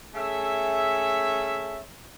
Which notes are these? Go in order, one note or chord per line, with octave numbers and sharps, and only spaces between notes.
A3 C#4 G#4 E5